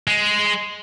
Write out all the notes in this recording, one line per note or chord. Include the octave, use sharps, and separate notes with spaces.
G#3